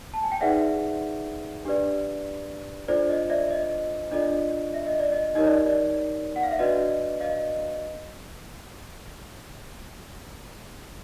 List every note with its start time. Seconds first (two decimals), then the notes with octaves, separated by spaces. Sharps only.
0.14 A5
0.23 G#5
0.32 G5
0.41 D#4 G#4 B4 D5 E5 F#5
1.65 D4 G4 B4 D5
2.88 D4 F4 A4 C5 D5
3.09 D#5
3.30 D5 E5
3.51 D#5
4.12 D4 F4 A4 D5 D#5
4.74 E5
4.87 D#5
4.99 D5
5.12 D#5
5.35 D#4 G4 A#4 C#5 D#5
5.46 D5
5.66 D5
6.36 F#5
6.43 F5
6.51 E5
6.59 D4 F#4 B4 D5 D#5
7.21 D#5 F5